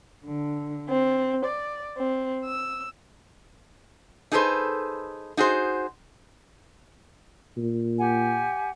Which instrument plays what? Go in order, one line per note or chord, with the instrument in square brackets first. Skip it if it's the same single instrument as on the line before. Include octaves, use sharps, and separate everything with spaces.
[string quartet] D3
C4
D5
C4
E6
[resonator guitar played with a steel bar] D#4 G#4 A4 B4 C5
D#4 F#4 G#4 C5
[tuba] A#2
[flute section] G4 F#5 G#5